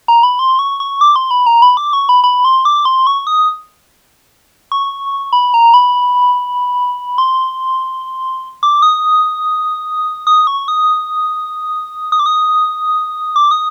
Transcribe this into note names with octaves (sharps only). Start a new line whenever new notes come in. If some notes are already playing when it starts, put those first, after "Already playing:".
A#5
B5
C6
C#6
C#6
D6
C6
B5
A#5
B5
D6
C#6
B5
B5
C6
D6
C6
C#6
D#6
C#6
B5
A#5
B5
C6
D6
D#6
D#6
C#6
D#6
D#6
D6
D#6
D6
D#6